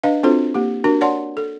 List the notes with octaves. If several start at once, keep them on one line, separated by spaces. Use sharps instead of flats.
D4 B4 D#5 F5
C4 D4 F4 F#4 A4 C5
A#3 G4
D4 F#4 A#4
C#5 D5 F#5 A5 C6
A4